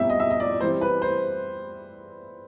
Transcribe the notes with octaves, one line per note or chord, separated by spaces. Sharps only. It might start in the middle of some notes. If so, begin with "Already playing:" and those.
Already playing: B2 G3 C4 E5
D#5
E5
D#5
D5
E3 G3 C4 C5
B4
C5